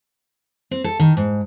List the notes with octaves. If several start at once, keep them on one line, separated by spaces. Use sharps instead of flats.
C4
A4
D#3
G#2